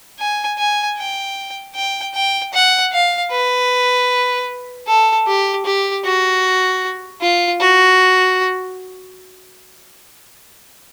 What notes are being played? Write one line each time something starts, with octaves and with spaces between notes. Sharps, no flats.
G#5
G#5
G5
G5
G5
F#5
F5
B4
A4
G4
G4
F#4
F4
F#4